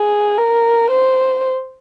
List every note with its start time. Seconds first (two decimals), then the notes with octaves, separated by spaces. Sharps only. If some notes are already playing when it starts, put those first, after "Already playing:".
Already playing: G#4
0.38 A#4
0.91 C5